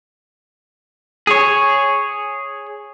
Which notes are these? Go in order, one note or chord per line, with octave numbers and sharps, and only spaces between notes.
G#4 C#5